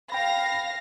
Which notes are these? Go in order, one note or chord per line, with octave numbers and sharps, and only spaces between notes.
F5 G5 B5 A#6